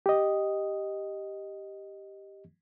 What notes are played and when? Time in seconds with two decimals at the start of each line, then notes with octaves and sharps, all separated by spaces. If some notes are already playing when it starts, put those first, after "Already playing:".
0.06 G4 D#5